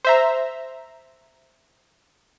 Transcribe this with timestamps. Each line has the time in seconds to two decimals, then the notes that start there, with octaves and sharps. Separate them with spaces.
0.05 C5 E5 A#5